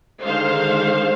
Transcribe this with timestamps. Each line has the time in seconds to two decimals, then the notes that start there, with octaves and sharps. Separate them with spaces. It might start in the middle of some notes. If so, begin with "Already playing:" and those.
0.22 D3 D#3 G#3 C5 F5